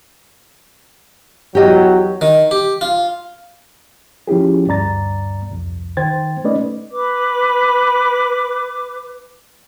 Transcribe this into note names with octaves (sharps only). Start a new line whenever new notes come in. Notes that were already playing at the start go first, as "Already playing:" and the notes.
E2 F#3 G4 D#5
D#3
G4
F4
F3 C#4 E4 G4 G#4
D2 G2 D5 A#5 A6
C2 F2
D#3 C5 G5 G#6 A6
A3 C#4 D#4 B4 D5 D#5
B4 D6